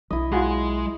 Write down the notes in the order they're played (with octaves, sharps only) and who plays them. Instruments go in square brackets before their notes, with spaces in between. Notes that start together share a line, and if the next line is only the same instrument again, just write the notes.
[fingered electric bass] B1 F#3 [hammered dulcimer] E4 D#5
[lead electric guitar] G#3 [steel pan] F4 F#4 G#4